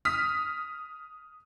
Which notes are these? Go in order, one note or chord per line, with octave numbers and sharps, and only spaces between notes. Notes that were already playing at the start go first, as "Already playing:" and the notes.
D#6 F6 B6